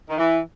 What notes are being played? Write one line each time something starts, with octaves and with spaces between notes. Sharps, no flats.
D#3
E3